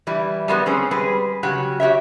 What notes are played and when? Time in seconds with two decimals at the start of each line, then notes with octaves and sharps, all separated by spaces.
0.07 E3 G3 E4
0.48 G3 G#3 A#3 B3
0.66 C4 C#4 G#4
0.91 G3 G#3 G#4 B4
1.43 C#3 F#3 C#4 F#4 G4
1.80 F#4 G4 C#5 E5